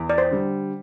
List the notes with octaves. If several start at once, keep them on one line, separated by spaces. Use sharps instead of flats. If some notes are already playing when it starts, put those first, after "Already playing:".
Already playing: E2
D5
C5
D3 G3